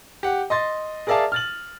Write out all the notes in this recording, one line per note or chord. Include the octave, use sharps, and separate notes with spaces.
G4 F#5
D#5 C6 A6
G#4 A#4 D5 E5 F5 A5
F6 A6 F#7